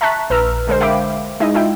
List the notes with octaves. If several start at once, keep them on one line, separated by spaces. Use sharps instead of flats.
E5 A5 A#5 C#6 F#6 B6
A#1 B4 A#5 E6 F6
D3 G#3 A#4 C5
E5 F5 G5 B5 D6
G#3 D#4 E4 D#5
E4 F4 E5 G5